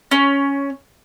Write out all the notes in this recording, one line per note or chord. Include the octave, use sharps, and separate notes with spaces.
C#4